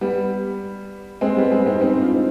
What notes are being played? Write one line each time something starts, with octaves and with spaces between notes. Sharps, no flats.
G3 B3
G#3 C4
G3 B3
G#3 C4
C4 D#4
C4 D#4
D4 F4